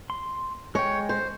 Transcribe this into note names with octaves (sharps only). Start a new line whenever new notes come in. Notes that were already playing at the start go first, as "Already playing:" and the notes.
C6
G#3 C#5 G5
C5